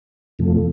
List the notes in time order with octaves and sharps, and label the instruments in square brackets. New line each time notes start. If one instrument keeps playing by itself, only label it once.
[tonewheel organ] F2 C3 F3 A3